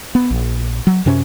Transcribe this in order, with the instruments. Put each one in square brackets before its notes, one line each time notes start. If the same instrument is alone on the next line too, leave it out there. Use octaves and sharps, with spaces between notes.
[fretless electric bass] B3
A#1
F#3
F#2 C3 C#4